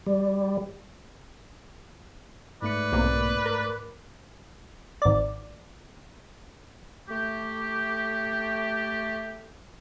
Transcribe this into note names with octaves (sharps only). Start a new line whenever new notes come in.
G3
G#2 A3 B4 D5 C#7
B1 C3 A#3
A#4
G#1 D5
A3 G4